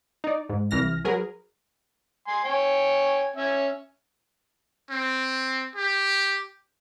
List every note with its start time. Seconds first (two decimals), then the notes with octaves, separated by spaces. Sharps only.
0.24 D#4 D5
0.49 G#2
0.71 C2 E3 F6 A#6
1.05 F#3 G#4 A#4 B4
2.27 G#5 C6
2.45 C#5 G5 G#5
3.36 C#4 E5
4.90 C4
5.76 G4